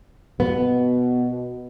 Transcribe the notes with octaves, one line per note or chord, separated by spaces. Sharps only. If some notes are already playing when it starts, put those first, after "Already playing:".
B2 B3